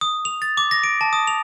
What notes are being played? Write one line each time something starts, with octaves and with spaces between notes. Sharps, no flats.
D#6
F7
A6
D6
A#6
D7
A5
D#6
F7